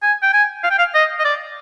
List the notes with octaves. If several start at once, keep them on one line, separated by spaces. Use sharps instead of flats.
G#5
G5
G#5
F5
G5
F5
D#5
D#5
D5